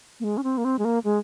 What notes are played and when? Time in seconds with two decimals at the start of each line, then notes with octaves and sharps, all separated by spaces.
0.20 A#3
0.24 G#3
0.37 C#4
0.44 C4
0.58 A#3
0.65 C4
0.79 G#3
0.85 A#3
1.04 G#3